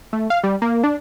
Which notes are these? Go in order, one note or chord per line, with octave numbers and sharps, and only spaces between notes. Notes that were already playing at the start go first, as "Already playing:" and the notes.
A3
F5
G3
A#3
D4